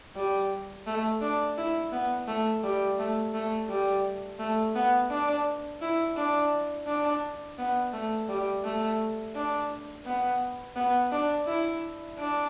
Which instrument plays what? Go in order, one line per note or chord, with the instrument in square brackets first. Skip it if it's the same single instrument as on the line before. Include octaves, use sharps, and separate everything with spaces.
[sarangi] G3
A3
D4
E4
B3
A3
G3
A3
A3
G3
A3
B3
D4
E4
D4
D4
B3
A3
G3
A3
D4
B3
B3
D4
E4
D4